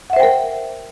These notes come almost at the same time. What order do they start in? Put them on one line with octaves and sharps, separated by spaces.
F#5 E5 C5 G5 A#4